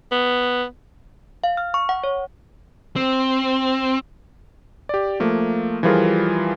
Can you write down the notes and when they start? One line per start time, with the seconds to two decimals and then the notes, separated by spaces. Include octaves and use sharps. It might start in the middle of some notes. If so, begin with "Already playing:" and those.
0.12 B3
1.44 F5
1.57 F6
1.74 C#6
1.89 F#5
2.04 C#5
2.96 C4
4.89 G4 D5
5.20 F3 A3 A#3
5.83 E3 F3 G3 F4 G#4 A#4